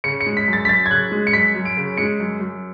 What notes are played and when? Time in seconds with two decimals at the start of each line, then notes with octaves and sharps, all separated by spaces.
0.04 C#3 C#7
0.21 C#7
0.26 G#3
0.37 B6
0.48 F#2
0.53 A6
0.65 B6
0.69 F#2 A6
0.86 G#6
0.91 C#3 F#6
1.11 G#3
1.27 C#7
1.33 F#2 B6
1.55 F#2
1.65 D7
1.77 C#3
1.97 G#3 C#7
2.20 F#2
2.40 F#2